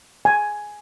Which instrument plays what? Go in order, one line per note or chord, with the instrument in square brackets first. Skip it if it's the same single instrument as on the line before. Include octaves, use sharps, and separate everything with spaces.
[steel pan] G#5